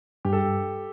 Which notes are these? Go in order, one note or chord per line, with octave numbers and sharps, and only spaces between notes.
G2 G4
A4